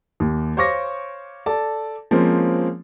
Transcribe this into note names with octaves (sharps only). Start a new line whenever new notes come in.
D#2
C5 C#5 F5 C#6 D6 A#6
A4 D5 A5
F3 G#3 A#3 C4 C#4